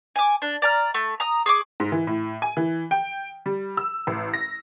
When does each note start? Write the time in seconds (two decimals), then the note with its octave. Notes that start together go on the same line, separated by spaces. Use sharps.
0.16 G#5 D6
0.42 D4
0.62 D5 A#5 F6
0.94 A3
1.20 A#5 D#6
1.46 G#4 C#6 D6
1.80 G#2
1.92 E3
2.07 A2
2.42 G#5
2.57 E3
2.91 G5
3.46 G3
3.77 E6
4.07 A1
4.34 A#6